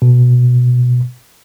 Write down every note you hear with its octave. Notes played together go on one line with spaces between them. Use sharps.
B2